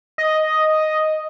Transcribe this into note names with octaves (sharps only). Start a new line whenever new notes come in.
D#5